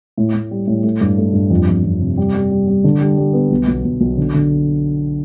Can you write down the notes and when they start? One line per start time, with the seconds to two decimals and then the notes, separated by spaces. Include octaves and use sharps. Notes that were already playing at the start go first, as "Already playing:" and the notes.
0.17 A2
0.34 A2
0.51 G3
0.67 A2
0.84 A3
1.01 G2
1.18 A3
1.33 G2
1.50 F2
1.68 F2
1.84 F2
2.00 C3
2.17 G3
2.34 G3
2.51 G3
2.67 G3
2.84 D3
3.01 G3
3.17 G3
3.33 B3
3.51 B1
3.68 B1
3.85 B1
4.01 B1
4.17 D3
4.34 D3